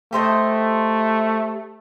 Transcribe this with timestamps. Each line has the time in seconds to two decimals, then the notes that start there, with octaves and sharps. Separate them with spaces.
0.13 A3 G4 C5 D#5